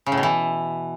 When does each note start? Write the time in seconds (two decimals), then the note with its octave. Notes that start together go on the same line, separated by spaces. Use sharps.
0.06 C#3
0.12 A2
0.17 B2
0.23 E3